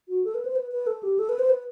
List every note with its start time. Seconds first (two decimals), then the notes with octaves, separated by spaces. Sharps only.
0.09 F#4
0.24 A4
0.35 B4
0.45 C5
0.56 B4
0.71 B4
0.87 A4
1.03 G4
1.19 A4
1.29 B4
1.39 C5
1.50 B4